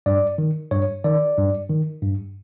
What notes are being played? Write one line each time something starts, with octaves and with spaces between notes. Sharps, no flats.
G2 D5
D#3
G2 C#5
D#3 D5
G2
D#3
G2